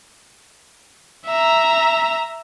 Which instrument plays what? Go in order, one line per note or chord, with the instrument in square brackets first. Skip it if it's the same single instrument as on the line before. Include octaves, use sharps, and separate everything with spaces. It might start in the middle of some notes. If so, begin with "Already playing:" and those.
[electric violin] E5 A#5